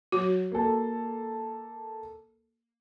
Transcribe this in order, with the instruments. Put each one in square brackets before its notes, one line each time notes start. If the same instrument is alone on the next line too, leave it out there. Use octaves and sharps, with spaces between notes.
[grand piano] F#3 [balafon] F#4
[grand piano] A#3 A4